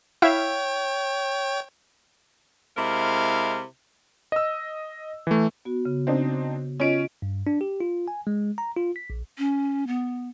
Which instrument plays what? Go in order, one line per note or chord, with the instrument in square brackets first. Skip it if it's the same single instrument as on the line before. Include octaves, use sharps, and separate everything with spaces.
[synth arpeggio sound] E4 E5 F5 [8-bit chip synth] C#5 G5
[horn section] C3 G#3 E4 A#4 F5
[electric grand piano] D#5 E6
E3 A3
[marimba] B3 F#4
C#3
[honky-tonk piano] C4 D4 D#4
[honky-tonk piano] C#4 D7 [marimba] F4 D#5
[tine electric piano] G2
D4
G4
F4
G#5
G#3
A#5
F4
B6
A#1
[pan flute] C#4
B3